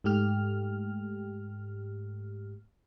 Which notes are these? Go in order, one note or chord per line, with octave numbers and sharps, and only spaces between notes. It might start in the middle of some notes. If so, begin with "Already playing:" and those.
G#2 A3 G4 F6